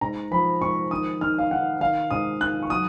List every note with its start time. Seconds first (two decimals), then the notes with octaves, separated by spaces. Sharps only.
0.01 G#2 A#5
0.31 F3 B5
0.61 G#2 C#6
0.91 D#3 D#6
1.21 D#3 F6
1.39 F5
1.51 D#3 F#5
1.80 D#3 F5
2.11 G#2 D#6
2.41 D#3 F#6
2.63 C#6
2.70 F#3 D#6